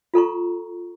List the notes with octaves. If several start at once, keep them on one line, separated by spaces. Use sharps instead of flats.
F4 A4 A#5 C#6